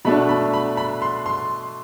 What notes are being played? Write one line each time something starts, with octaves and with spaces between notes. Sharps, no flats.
B2 A3 D4 B5
B5
B5
B5
C6
C6